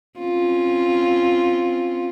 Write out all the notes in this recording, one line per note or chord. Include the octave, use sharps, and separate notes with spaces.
C4 C#4 F4